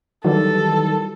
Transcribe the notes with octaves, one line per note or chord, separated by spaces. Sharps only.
D#3 E3 F#3 G3 A4